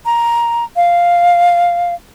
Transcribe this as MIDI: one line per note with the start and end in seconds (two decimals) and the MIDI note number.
0.06 0.64 82
0.76 1.94 77